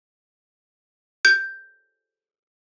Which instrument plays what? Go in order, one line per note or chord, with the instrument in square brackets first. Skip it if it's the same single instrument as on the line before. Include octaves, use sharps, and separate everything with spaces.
[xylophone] G6